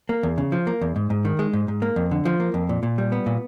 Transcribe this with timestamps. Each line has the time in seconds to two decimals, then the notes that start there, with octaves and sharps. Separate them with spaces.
0.09 A#3
0.23 E2
0.38 C#3
0.52 F3
0.67 A#3
0.81 E2
0.96 G#2
1.10 G#2
1.25 D#3
1.39 G#3
1.53 G#2
1.68 G#2
1.82 A#3
1.96 F2
2.11 D3
2.25 F3
2.40 A#3
2.54 F2
2.69 A#2
2.83 A#2
2.98 G3
3.12 B3
3.26 A#2